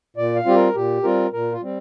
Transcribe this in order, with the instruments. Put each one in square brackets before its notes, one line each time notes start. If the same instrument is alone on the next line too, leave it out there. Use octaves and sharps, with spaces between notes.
[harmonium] A#2 D5
F5
G3 C4 F4 G4
A#4
A#2 G4
G3 C4 F4 A#4
A#2 A#4
F4
G3 C4